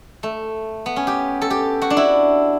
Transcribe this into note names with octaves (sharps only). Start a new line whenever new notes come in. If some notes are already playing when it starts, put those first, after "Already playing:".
A3
B3
C#4
G4
A4
G4
F#4
D4
E4